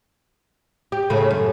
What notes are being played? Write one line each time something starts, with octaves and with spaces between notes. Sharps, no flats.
G4
A2 C#3 A3
F#2